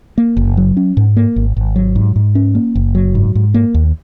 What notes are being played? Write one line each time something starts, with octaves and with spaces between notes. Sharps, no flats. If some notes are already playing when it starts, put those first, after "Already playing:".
A#3
F#1
F#3
C#4
G#2
A#3
G#1
G#1
F#3
G#2
G#2
C#4
A#3
F#1
F#3
G#2
G#2
A#3
D#2